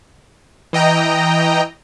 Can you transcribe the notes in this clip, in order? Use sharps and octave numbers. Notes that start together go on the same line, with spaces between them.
E3 D#5 G5 A#5